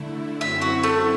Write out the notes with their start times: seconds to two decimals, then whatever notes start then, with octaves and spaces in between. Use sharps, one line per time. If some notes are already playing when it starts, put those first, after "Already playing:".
Already playing: D3 A3 E4
0.41 F#2 F#3 C4 E4 E5
0.62 F#4
0.83 A3